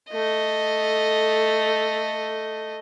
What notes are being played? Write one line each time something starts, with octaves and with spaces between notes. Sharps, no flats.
A3 D#5